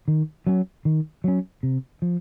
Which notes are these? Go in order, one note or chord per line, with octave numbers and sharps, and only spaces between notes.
D#3
F#3 C#4
D#3
F#3 C#4
C3
F3